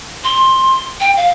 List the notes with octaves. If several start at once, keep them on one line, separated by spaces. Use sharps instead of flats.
C6
G5
F5